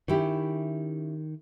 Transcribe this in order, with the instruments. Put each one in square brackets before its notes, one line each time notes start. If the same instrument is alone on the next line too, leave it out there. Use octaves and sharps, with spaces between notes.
[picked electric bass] D#3 [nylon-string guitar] C#4 E4 G4